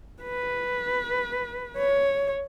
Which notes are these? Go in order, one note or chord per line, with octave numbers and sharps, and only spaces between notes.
B4
C#5